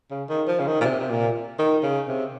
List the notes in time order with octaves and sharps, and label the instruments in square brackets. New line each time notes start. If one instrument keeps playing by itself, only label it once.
[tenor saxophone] C#3
D#3
F3
C#3
D#3
A#2
C3
C3
A#2
D#3
C#3
C3